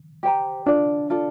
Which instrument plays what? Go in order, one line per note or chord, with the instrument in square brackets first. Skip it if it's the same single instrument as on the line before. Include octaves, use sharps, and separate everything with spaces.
[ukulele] G4 C5 G5 A#5
[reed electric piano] D4 [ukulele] F4 A4 D5
[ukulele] F4 A4 D5